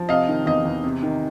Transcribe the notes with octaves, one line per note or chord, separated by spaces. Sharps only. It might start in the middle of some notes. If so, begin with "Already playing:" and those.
Already playing: F3
C3 D#5 F5
D#3
E2 D#5
E2
C3
D#3